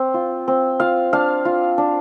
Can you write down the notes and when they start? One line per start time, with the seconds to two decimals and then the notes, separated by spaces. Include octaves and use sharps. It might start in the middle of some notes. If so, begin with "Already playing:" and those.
Already playing: C4
0.14 F4
0.48 C4
0.80 F4 F5
1.13 D4 F5
1.45 F4
1.78 D4